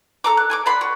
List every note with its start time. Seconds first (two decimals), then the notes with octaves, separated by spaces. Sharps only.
0.24 A4 A#5 D6
0.37 F#6
0.50 G#5 C#6 D6
0.66 D5 F#5 B5 C6
0.81 F#4